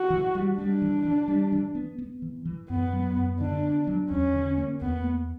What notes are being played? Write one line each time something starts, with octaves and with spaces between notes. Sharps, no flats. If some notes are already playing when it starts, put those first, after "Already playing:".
Already playing: F#4
E3
G3
G3 D4
E3
E3
G3
E3
B3
B3
E3
E3
F#2 B3
F#3
F#2
D3 D4
B3
F#3
E2 C#4
D3
A#3
E2 B3
A#3